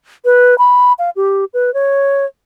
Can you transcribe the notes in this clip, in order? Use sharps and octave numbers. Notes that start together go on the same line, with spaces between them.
B4
B5
F5
G4
B4
C#5